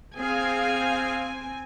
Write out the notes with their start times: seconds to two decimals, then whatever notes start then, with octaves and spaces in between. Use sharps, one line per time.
0.17 C4 G#4 F5 G#5